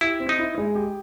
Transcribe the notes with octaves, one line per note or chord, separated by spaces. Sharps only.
E4 G4
C4
D#4
E4
G#3
G4